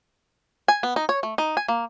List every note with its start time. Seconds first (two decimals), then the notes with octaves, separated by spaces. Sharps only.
0.68 G#5
0.83 B3
0.96 D#4
1.09 C#5
1.23 A3
1.38 D#4
1.57 G#5
1.68 A#3